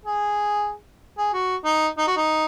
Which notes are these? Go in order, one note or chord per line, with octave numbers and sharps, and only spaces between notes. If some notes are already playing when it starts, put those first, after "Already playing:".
G#4
G#4
F#4
D#4
D#4
F#4
D#4